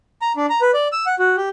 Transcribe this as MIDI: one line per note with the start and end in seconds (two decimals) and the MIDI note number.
0.22 0.32 82
0.37 0.46 62
0.50 0.61 82
0.61 0.71 71
0.74 0.88 74
0.92 1.05 88
1.06 1.15 78
1.19 1.36 66
1.37 1.49 67